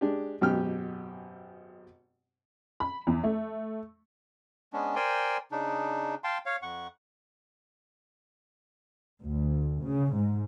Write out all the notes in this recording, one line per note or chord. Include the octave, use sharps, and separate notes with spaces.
G#3 D4 G4
G#1 F#2 B2 G4 G5 F6
B5
E2
A3
G#3 B3 C#4 D4
A#4 C5 D5 G5 G#5 C6
C#3 D4 D#4
F5 G5 A5 C6
C#5 F5
F2 F#5 C#6
D2
C#3
G#2